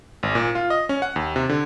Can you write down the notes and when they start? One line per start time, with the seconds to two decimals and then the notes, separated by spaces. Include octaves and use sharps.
0.23 G#1
0.35 A#2
0.55 F4
0.70 D#5
0.89 C#4
1.02 F#5
1.16 D#2
1.36 C3
1.49 D3